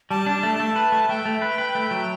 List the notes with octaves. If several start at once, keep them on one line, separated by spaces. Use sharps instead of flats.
G3 A5
D4
A3
A3
B4
A3
A3 G5
A3
B4
B4
A3
F#3